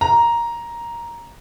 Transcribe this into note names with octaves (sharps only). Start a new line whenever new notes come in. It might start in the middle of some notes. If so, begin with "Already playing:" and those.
A#5